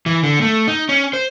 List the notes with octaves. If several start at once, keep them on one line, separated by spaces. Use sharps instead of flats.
E3
D3
A3
D#4
C#4
C5